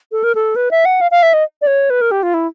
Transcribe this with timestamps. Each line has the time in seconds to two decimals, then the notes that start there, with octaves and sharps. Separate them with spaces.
0.12 A4
0.24 A#4
0.35 A4
0.56 B4
0.71 E5
0.85 F#5
1.01 F5
1.11 F5
1.23 E5
1.34 D#5
1.62 D5
1.67 C#5
1.90 B4
2.01 A#4
2.11 G4
2.23 F4
2.34 E4